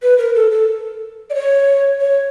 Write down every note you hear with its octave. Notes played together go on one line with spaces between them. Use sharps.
B4
A#4
A4
A4
D5
C#5
C#5